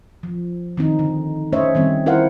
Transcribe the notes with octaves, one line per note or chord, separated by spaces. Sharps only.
F3
D#3 C4 D#4
D3
A3 C#4 C5 C#5 D#5 E5
D#3 G3 C4
E4 A#4 C5 F5 F#5